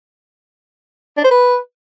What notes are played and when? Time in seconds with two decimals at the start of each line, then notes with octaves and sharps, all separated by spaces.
1.17 D4
1.24 C5
1.31 B4